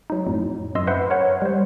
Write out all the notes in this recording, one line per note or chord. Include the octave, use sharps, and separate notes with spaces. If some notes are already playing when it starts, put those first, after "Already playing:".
F#3 D#4
F2 A2 F#3
F#2 D#5 C6 E6
B4 C5 E5 F#5 B5 C6
A#4 C#5 F#5
G3 C5